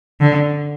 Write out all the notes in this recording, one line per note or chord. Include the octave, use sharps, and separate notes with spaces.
D3